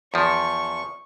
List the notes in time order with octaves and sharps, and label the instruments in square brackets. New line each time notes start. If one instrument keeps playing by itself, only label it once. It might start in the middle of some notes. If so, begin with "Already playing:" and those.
[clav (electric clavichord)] E2 F3 [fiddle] C#6